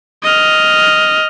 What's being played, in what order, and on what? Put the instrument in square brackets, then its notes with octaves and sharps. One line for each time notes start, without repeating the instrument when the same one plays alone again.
[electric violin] D#5 F6